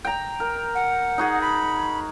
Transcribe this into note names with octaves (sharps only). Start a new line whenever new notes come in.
G5 A#5
A#4
F#5
D#4 F#4 G#4
B5